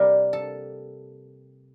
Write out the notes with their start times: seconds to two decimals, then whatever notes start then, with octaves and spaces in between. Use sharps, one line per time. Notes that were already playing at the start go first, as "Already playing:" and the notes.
Already playing: C3 G3 A#3 A#4
0.33 A4